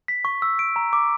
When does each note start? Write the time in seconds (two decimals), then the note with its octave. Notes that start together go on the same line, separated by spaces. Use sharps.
0.08 B6
0.25 C#6
0.42 E6
0.59 D7
0.76 A#5
0.93 D6